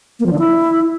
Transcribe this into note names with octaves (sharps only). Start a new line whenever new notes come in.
A#3
F3
D3
E4